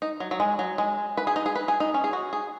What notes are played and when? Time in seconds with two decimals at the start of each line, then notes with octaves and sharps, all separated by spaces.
0.02 D#4
0.20 F#3
0.31 F#3
0.40 G#3
0.59 F#3
0.78 G#3
1.17 B4
1.27 G#4
1.36 D#4
1.46 G#4
1.55 B4
1.68 G#4
1.80 D#4
1.94 C#4
2.04 G#4
2.13 F#4
2.33 G#4